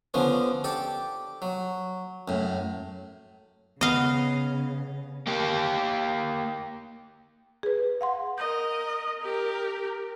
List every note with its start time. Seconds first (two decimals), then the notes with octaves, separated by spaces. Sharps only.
0.14 D3 F3 B3 C#4
0.64 G4 A4 D5
1.42 F#3
2.28 F#2 A2
3.81 C#3 B3 D#5 F5
5.27 A#3 G4
7.63 G#4 B4
8.01 F5 F#5 C6
8.38 A#4 D#5 G6
9.21 G4 A#4